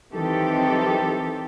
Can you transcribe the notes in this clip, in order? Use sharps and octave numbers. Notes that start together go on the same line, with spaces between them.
D#3 E3 F#3 C4 G4 A4